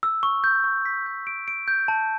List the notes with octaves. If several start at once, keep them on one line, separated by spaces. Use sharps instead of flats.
E6
C#6
G6
C#6
B6
G6
D7
D7
G6
A5